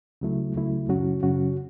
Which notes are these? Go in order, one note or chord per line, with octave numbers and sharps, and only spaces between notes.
C#2 C#3 F#3 A3 E4
C#2 C#3 F#3 A3 E4
F#2 C#3 F#3 C#4 F#4
F#2 C#3 F#3 C#4 F#4